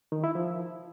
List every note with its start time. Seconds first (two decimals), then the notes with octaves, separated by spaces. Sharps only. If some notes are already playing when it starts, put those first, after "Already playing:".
0.12 D#3
0.24 E4
0.35 F3